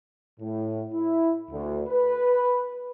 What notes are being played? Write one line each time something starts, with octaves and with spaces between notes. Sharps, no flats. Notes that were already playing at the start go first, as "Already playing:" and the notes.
A2
E4
D2
B4